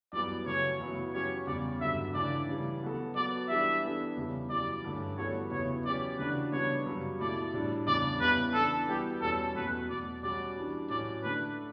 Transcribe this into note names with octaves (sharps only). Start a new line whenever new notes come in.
F#2 E3 G3 B3 D5
C#3 F#3 A3 C#4 C#5
F#2 C#3 F#3 B3 E4
F#3 C#4 G4 C#5
E2 C#3 G3 D5
G2 D3 F#3 E5
C#3 E3 A3 D4 D5
C#3 E3 G3
F#3 B3 F#4 A4
F#3 B3 F#4 A4 D5
E3 G3 D4 G4 E5
E3 B3 D4 A4
E2 C#3 G3
F#2 E3 G3 D5
G2 D3 A3 C#4
E3 G3 B3 F#4 A4 C#5
E2 C#3 F#3 B3 E4 C#5
F#3 C#4 G4 D5
C#3 E3 A3 D4 F#4 B4
C#3 G3 B3 D4 C#5
F#2 C#3 G3
B2 A3 E4 D5
A2 G3 D4
E2 C#3 G3 D4 D5
E2 C#3 G3 B3 E4 B4
E3 B3 D4 A4
E3 G3 B3 F#4 G4
E2 B2 G3 C#4 A4
E2 B2 F#3 A3 B4
E2 B2 F#3 D5
B2 G3 C#4 F#4 D5
E3 G3 D4
A2 F#3 C#4 F#4 D5
D3 A3 D4 B4